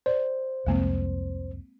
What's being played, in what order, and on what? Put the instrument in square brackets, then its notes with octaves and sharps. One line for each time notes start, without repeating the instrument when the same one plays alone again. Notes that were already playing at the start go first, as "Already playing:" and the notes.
[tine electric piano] C5 [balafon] D5
[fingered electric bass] C2 F2 C3 [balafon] G#3 A#3 C4